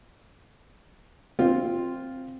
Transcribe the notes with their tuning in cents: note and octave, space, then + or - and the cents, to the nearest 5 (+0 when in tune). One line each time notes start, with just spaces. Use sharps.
C4 +5 F4 +0